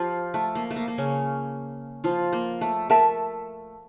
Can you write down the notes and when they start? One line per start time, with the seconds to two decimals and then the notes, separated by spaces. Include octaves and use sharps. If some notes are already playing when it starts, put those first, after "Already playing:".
Already playing: F3 F4 G4
0.34 A3
0.55 A#3
0.71 A3
0.76 A#3
0.88 A#3
0.98 C#3 C#4
2.04 F3 F4
2.33 A#3
2.61 A3
2.90 A3 A#4 E5 A5